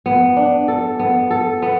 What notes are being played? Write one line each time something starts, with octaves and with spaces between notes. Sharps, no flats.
B3
D4
A4
B3
A4
B3